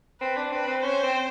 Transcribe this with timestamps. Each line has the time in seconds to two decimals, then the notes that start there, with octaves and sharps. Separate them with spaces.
0.20 C4 B4
0.36 D4
0.52 C4 B4
0.67 C4
0.82 C#4 C5
1.03 C4